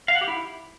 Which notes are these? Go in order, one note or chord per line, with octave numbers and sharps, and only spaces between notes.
F5
F#5
G4
E4